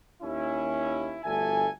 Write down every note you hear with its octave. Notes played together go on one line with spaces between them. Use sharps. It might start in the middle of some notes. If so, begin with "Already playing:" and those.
D#2 C#4 E4
G1 D2 A4 E5 G#5